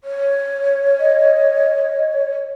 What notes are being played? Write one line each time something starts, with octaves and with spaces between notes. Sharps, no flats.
C#5
D#5